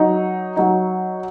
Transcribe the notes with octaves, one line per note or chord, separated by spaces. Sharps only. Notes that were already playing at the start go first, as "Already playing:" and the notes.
Already playing: F#3 D#4
F#3 D#4